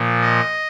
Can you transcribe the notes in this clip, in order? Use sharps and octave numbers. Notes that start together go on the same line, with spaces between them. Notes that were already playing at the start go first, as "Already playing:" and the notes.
Already playing: A#2 F3
D#5